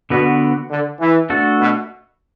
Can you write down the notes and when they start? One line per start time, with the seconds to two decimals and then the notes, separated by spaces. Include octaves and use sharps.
0.10 B2 D3 B3 F#4 B4
0.71 D3
1.00 E3
1.30 A3 D4 F#4 A4
1.60 B2